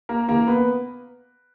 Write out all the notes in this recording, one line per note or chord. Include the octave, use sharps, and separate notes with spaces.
A#3 A#4
C#3 E3 A#3 A#4
B3 B4